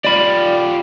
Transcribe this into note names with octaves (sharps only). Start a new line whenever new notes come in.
F4 G4 D5 B5